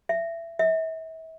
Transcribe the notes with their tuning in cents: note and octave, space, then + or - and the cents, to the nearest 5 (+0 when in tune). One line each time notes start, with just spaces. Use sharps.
E5 +20
E5 -35